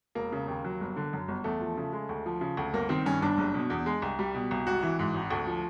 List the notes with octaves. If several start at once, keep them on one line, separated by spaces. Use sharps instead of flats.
E1 A#3
C#3
D#2
F#3
G1
D3
F#2
G1
E2 A3
F3
C#3
G#3
D2
F3
C#3
D2
G1 A#3
D#3 C4
G2 C#4
G1 D4
F#1
B2
E2
G#3
C2
G3
B2
C2
G#1 F#4
E3
G#2
G#1
D2
F3